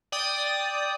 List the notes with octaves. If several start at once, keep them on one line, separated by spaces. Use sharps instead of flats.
D5 G5 D#6